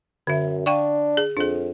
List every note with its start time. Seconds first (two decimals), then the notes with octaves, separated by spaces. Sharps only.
0.27 F#2 D3 E5
0.66 D4 F5 G5 C#6
1.17 G#4
1.37 F2 D4 G#4